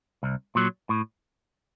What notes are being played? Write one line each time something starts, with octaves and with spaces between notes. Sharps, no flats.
C2
A#2 F#3
A2